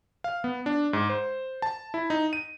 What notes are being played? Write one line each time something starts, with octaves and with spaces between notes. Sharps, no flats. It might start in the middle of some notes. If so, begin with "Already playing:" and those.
F5
B3
D4
G#2
C5
A5
E4
D#4
D#7